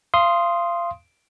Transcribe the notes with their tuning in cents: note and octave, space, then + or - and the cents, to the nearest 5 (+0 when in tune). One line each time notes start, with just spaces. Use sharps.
F5 -25 C6 +0 D#6 +0